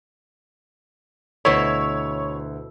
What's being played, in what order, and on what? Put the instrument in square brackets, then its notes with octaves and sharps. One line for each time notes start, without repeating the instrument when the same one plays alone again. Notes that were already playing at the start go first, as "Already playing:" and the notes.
[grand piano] D2 [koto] B2 E4 [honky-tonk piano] C#5